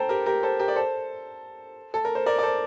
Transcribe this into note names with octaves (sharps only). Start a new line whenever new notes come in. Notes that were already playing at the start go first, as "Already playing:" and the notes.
Already playing: A4 C5 G5 A#5
G4 A#4
G4 A#4
A4 C5
G4 A#4
D5
A4 C5
A4
A#4
C5
A#4 D5
D5
A4 C5